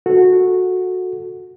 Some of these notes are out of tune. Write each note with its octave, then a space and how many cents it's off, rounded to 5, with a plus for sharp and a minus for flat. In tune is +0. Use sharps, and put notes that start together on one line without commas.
F#4 -15 A4 +0